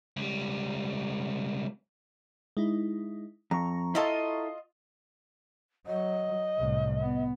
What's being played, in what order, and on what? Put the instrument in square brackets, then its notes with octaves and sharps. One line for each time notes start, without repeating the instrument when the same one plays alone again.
[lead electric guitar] C#2 G3
[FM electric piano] G#3 D#4 E4
[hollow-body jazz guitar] F2 [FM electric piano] A#5 C#6
[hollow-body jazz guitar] E4 A4 [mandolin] F4 D#5
[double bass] F#3 [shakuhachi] D#5
[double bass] C2 A2
B3